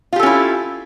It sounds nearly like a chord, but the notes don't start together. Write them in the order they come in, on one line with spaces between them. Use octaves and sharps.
F4 G4 A4 C#4 E4